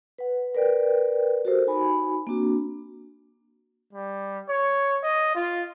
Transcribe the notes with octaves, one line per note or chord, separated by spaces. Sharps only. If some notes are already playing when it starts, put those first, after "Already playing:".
B4 F#5
A#4 B4 D5 G5
F#4 G4 A4 A#4 C5
D#4 F#4 G#5 B5
A#3 C4 D4 F#4
G3
C#5
D#5
F4